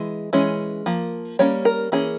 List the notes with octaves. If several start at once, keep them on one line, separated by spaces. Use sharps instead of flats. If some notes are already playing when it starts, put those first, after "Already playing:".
Already playing: E3 G#3
E3 G#3 C#4
F3 A#3
G3 A#3 C#4 C#5
A#4
E3 A#3 C#4 G#4